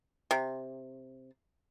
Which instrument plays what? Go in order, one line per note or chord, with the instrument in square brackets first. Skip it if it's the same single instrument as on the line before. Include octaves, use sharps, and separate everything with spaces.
[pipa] C3